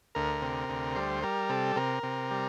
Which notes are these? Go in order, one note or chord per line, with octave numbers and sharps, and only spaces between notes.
D2 A#4
C3
D2
G3 C5
G3 A#4
C3 A4
C3 A#4
C3
G3